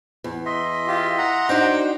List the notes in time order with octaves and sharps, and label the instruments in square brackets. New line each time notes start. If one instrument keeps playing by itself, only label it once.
[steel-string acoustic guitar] E2
[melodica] D#5 E5 C6
[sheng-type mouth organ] F4 G4
F#5 A#5
[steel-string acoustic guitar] D4 D#4 F#4 [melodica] C5 G5